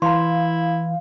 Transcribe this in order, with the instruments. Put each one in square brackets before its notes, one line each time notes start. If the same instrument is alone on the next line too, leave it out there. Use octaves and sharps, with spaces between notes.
[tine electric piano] E3 [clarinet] E4 [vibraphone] F5 [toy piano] A#5 C6